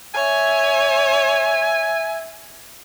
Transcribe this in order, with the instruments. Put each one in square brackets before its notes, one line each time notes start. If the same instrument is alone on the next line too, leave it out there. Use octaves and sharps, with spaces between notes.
[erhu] C#5 [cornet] E5 [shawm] G#5